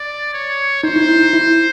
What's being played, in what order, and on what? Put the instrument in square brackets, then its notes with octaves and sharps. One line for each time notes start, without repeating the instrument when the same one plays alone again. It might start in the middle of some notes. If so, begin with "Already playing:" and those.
Already playing: [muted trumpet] D5
C#5
[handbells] D#4 [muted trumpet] C5
[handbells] E4
D#4
E4